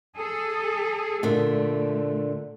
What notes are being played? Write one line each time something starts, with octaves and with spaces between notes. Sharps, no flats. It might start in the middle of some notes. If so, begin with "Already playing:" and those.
G#4 A4
A#2 D3 A3